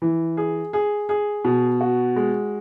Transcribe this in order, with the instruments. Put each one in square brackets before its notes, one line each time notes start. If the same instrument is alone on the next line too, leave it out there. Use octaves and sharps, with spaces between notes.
[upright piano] E3
G#4
G#4
G#4
B2
F#4
G#3